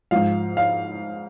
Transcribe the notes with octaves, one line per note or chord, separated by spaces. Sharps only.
G#2 F3 F5
F5